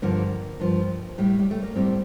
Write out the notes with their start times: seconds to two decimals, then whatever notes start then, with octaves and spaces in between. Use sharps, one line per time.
0.02 G2 D3 F3 A#3
0.60 G2 F3
1.18 A2 G3
1.39 G3
1.51 A3
1.63 A#3
1.75 A2 G3 C4